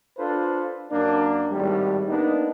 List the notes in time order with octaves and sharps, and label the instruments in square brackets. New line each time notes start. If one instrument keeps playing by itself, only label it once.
[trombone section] D4 F4 A4 B4 C5
F#2 A#3 D4
G#1 A2 G3
A#3 B3 D4 D#4